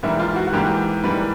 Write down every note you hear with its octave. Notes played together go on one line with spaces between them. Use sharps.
G#2 E3 G3 A#3 E4
F4
F#4
F#4
G#2 E3 G3 A#3 G4
G#2 E3 G3 A#3 B4